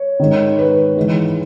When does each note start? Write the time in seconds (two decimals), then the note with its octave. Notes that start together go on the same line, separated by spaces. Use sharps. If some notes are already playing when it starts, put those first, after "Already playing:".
Already playing: C#5
0.19 G#2 D#3
0.59 B4
0.97 G#2 E3